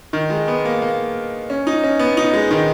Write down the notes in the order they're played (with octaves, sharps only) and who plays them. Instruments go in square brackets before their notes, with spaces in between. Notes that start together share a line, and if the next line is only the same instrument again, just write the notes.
[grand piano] D#3
G#3
B3
A#3
A#3
C#4
D#4
C#4
B3
D#4
G#3
D#3